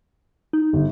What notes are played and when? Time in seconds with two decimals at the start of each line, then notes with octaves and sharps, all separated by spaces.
0.53 D#4
0.73 G1